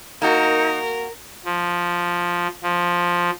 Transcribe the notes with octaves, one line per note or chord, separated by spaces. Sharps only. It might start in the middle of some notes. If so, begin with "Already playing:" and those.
A#3 D#4 F#4 A#4
F3
F3